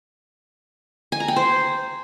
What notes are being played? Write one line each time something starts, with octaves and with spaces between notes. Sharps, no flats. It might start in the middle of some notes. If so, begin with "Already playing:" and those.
G#5
A#5
G5
C5